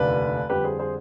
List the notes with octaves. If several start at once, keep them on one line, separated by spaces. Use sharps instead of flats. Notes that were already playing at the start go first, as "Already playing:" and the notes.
Already playing: F1 D#2 D3 B4 D5
F2 D3 G3 G4 B4
G#4 C5
G#4 C5